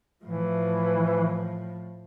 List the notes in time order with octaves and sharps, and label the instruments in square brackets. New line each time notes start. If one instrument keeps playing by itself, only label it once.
[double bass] A2 F3 [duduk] E3